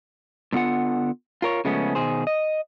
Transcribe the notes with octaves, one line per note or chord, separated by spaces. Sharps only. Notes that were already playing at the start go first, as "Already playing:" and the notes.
A2 D3 B3 F4 F#5
F4 A#4 C#5
C#3 F3 G#3 A3 B3 C#4
B2 D#3 G#4 C5
D#5